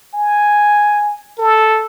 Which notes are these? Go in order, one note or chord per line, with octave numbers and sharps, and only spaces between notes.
G#5
A4